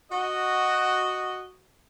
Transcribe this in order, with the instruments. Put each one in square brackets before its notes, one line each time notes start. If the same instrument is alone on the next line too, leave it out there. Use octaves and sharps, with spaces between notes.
[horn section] F#4 D#5